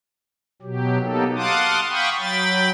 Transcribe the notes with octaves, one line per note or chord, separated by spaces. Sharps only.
B2 F#3 G4
F#3 A#3 B3 D#4 G4 A4
F5 F#5 A5 C6 D6 D#6
F5 G5 B5 C#6 D#6
F#3 G5 B5 A6